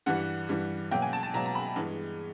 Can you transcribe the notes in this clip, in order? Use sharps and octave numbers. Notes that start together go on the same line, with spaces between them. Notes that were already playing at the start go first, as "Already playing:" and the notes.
G2 E3 G3 F#5
G2 E3 G3
B2 F#3 A#3 G5
G#5
A5
A5
B2 F#3 A#3 A#5
A#5
B5
G2 E3 G#3 B3